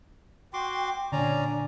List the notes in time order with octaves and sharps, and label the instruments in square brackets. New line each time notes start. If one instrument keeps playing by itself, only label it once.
[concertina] F#4 C6 D6 [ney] G5
[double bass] A#2 D4 [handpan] D3 [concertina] C#4 D5 A#5 [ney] G#5